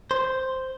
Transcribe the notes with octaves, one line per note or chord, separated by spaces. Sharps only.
C5